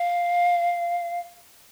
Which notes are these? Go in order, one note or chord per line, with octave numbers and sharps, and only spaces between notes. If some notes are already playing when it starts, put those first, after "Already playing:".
Already playing: F5